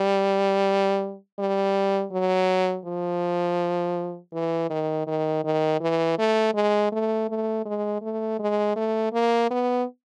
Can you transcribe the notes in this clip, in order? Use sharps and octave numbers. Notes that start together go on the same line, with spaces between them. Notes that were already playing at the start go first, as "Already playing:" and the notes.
Already playing: G3
G3
F#3
F3
E3
D#3
D#3
D#3
E3
A3
G#3
A3
A3
G#3
A3
G#3
A3
A#3
B3